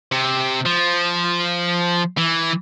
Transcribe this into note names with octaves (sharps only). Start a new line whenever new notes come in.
C3
F3
E3